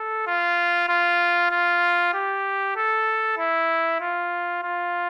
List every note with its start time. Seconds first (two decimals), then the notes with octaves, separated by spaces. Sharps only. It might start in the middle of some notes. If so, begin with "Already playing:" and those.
Already playing: A4
0.27 F4
0.89 F4
1.51 F4
2.14 G4
2.76 A4
3.38 E4
4.01 F4
4.63 F4